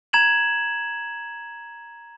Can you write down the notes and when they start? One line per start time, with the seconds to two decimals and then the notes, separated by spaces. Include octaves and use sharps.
0.13 A#5 G#6 E7 F#7